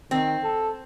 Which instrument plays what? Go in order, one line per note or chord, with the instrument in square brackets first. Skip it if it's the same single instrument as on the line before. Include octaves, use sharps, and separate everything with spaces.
[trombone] D#3 [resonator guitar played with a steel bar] C4
[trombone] A4